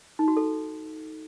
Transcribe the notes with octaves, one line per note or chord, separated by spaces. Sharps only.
D#4
F#4
A4